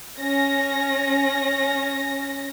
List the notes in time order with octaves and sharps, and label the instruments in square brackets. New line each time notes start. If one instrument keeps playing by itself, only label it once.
[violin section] C#4 A#6